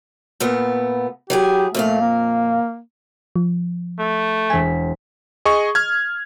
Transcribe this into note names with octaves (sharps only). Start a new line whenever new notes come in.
A#2 A3 B3
F#3 E4 G4 G#4
F2 A#2 A3 F5
A#3
F3
A3
E1 G#5 B6
G#4 D#5 C#6
F6 G#6